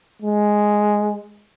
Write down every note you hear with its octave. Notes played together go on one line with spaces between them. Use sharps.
G#3